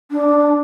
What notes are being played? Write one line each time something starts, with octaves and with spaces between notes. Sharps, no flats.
D4